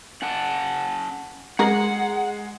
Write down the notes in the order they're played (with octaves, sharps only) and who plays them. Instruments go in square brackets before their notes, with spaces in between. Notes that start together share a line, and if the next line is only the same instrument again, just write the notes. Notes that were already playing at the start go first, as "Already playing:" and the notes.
[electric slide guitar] C#4 F#5 A5
[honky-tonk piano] G#3 [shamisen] G#4 A#4 [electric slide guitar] F#5